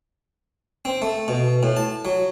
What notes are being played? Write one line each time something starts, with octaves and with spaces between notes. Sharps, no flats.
C4
A3
B2
A2
A5
F#3